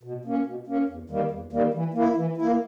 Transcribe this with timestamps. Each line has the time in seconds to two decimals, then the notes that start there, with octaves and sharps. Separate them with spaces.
0.03 B2
0.25 A#3 C#4
0.46 B2
0.67 A#3 C#4
0.89 E2
1.10 D#3 G3 A#3
1.31 E2
1.52 D#3 G3 A#3
1.74 E3
1.94 A#3 E4
2.16 E3
2.37 A#3 E4